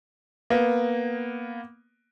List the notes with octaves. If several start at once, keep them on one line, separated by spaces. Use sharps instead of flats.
A#3 B3